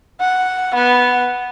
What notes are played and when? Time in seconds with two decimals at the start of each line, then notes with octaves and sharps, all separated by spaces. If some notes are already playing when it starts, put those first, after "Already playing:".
0.21 F#5
0.75 B3